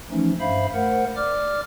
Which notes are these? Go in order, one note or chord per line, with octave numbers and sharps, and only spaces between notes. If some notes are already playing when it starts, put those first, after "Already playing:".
E3 F3 A3 C#4 D#4
G2 C5 E5 F5 B5
A3 A#4 C5 F#5
D5 D6 F6